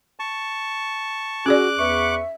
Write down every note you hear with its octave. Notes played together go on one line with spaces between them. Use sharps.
A5 C#6
C#4 F#4 G#4 D5 D6 F#6
E2 B4 E5 C#6